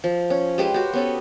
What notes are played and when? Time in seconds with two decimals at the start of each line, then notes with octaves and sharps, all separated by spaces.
0.04 F3
0.30 C#4
0.58 G#3 G4 B4 C5
0.74 F#4 G4
0.93 B3 C#4 A4